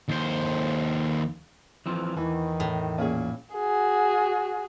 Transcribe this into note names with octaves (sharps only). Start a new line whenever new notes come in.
D#2 C5
E3 F3 C4
E2 D#3 E3
A2
A#2 C#4 G#4
F#4 G#4